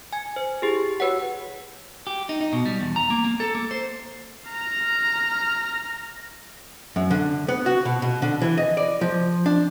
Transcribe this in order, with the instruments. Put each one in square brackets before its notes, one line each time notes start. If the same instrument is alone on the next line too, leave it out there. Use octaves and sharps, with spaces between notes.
[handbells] G#5 G#6
C5
E4 G4 G#4
F#4 B4 C#5 F#5
[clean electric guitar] G4
D#4
D#4
B2
G3
E2
A#5
A#3
A#3
A4
A#3
C5
[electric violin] A#5 F6
[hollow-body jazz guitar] F#2
D3
B3
F#4
B2
B2
D3
E3
D#5
D5
F3
D4